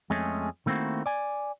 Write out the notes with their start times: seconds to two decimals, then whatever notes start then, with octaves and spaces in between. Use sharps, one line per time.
0.10 F2 G#3 A3 C#4 G#4
0.66 D#3 A3 A#3 C4 E4 F#4
1.06 D5 G#5